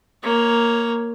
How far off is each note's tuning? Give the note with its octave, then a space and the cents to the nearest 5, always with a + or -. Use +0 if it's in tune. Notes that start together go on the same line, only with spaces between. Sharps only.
A#3 +0 C#5 +0